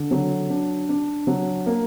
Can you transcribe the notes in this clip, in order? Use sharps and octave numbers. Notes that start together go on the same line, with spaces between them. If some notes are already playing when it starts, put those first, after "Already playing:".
Already playing: D3
F#3
D4
D4
F#3
A#3